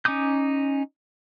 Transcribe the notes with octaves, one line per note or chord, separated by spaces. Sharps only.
C#4 D#4 D6 D#6 G6